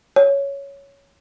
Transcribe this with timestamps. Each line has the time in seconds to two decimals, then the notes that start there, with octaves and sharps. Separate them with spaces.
0.16 C#5